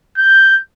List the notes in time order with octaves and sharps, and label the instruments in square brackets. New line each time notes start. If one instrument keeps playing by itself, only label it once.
[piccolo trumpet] G6